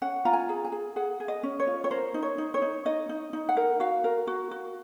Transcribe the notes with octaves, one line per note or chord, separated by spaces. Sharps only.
C#4 F#5
F4 A#5
G#5
G#4
G#5
G#4
G#4 F#5
G#4
D#5
C#4
C#5
F4
C#5
A#4 C5
D#4
C#5
D#4
C#5
D#4
D#4 D#5
D#4
D#4
F#5
A#4
F#4 F5
A#4
F#4
F#4